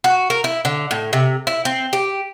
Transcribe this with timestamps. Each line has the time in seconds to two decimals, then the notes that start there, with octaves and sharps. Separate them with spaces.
0.04 F#4
0.30 A#4
0.44 E4
0.65 D3
0.91 A2
1.13 C3
1.47 E4
1.65 C4
1.93 G4